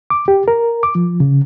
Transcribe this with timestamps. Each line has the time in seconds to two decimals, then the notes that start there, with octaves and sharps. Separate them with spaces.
0.10 D6
0.28 G4
0.48 A#4
0.83 D6
0.95 F3
1.20 C#3